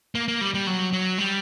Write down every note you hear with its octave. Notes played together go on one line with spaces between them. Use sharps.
A#3
A#3
G3
G3
F#3
F#3
G3